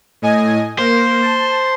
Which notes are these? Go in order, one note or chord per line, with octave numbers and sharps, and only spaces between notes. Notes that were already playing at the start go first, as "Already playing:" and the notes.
A2 D#5 G#5
A#3 C5
A5